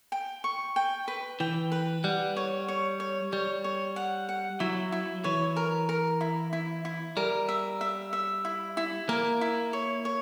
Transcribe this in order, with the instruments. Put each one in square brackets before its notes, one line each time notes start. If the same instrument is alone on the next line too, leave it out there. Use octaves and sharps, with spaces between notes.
[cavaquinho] G5
C#6
G5
B4
[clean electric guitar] E3 [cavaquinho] G5
[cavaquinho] B4
[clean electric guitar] G3 [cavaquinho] F#5
[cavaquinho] C#5
C#5
C#5
[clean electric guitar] G3 [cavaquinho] C#5
[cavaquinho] C#5
F#5
F#5
[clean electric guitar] F#3 [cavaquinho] E4
[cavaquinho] E4
[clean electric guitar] E3 [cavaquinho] C#5
[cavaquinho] A#4
A#4
E4
E4
E4
[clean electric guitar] G3 [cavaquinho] A#4
[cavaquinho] E5
E5
E5
E4
E4
[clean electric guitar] A#3 [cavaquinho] A#4
[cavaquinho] E4
C#5
C#5